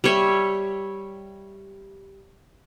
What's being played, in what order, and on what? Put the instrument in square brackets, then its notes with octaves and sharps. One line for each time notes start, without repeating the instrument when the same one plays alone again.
[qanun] G3 C#5 E5